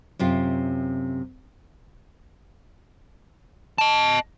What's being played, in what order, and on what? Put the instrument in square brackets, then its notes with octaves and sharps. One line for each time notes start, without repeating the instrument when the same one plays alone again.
[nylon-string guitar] F#2 C3 F4
[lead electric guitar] D#5 A5